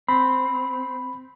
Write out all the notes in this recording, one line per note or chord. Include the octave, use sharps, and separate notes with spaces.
C4 B5